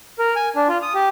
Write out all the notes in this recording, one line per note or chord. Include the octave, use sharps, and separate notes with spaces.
A#4
G#5
D4
F4
D#6
G4